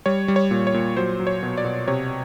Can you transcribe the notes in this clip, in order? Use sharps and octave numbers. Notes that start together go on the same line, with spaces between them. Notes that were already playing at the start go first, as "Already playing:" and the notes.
G3 C#5
G3
C#5
A#2
C#5
A#2
F#3 C5
F#3
C#5
B2
D5
B2
C3 C#5